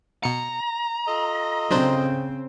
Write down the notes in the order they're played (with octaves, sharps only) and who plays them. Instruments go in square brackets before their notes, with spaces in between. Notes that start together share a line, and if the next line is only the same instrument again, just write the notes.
[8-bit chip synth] B2 C#7 [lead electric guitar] A#5
[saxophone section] F4 A4 D#5
[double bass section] C#3 C4 [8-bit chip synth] F#3 D4 C5